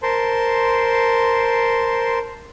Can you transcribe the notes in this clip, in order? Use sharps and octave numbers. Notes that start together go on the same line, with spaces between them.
A#4 C5 A5 C6